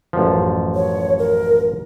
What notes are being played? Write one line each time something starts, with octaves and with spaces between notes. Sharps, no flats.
A1 F#2 F3
C#5
A#4